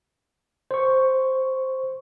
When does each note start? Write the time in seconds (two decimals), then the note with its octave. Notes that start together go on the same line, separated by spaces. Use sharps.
0.71 C5 C#6